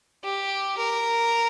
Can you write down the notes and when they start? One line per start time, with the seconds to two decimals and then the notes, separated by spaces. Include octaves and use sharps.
0.24 G4
0.78 A#4